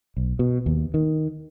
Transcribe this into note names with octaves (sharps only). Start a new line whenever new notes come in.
B1
B2
D#2
D#3